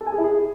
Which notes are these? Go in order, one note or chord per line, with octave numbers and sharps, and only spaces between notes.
A4
G#5
G#4
E4
G#4